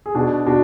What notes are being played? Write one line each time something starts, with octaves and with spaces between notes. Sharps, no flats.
G#4
B2 D4 F#4
B2 D4 F#4